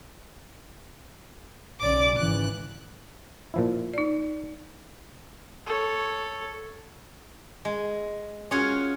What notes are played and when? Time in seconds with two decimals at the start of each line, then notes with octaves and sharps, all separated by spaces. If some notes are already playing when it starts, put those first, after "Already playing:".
1.80 B1 C#3 D5 D6
2.17 G#1 C#3 E3 F#6
3.54 A#2 F3 E4
3.94 D#4 D5
5.67 A4 C#5
7.65 G#3
8.51 C#4 F4 F#4 G#4 C#5